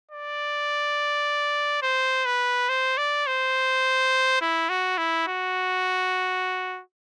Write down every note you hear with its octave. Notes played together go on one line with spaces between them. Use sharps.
D5
C5
B4
C5
D5
C5
E4
F#4
E4
F#4